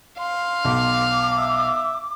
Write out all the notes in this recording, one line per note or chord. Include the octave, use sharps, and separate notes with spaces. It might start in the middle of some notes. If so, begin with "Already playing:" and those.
F5 C6
B1 D6
E5